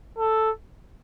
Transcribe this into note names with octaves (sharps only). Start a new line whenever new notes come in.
A4